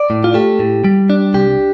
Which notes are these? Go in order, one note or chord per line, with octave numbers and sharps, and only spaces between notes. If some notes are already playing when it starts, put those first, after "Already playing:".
Already playing: D5
A2
F4
A3 G4
A2
G3
D4
C2 G4